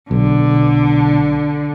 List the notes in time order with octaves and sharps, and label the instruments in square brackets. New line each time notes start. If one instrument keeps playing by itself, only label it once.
[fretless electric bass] B1 [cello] D3